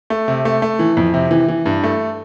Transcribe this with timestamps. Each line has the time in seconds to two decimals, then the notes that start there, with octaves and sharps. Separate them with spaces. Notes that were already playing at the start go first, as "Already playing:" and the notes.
0.10 A3
0.28 C3
0.45 A3
0.62 A3
0.79 E3
0.97 F2
1.14 C3
1.31 E3
1.48 E3
1.66 G2
1.83 A3